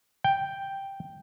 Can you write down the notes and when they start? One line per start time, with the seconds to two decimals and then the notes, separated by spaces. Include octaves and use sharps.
0.24 G5